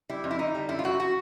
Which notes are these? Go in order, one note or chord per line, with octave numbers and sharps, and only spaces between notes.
G3 E4
F2
E4
D3 D#4
G3
F#2 E4
F4
F#2 F#4
F#4